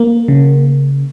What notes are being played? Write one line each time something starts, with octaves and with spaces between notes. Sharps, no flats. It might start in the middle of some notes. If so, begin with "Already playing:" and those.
Already playing: A#3
C#3